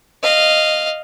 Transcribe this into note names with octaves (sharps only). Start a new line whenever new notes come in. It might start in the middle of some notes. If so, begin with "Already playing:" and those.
D#5 F5